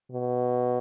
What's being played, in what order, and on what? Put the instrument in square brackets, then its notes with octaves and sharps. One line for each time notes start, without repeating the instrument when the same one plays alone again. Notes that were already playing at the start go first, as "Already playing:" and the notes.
[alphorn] B2